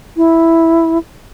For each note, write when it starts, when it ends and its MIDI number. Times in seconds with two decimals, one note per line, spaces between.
0.17 0.98 64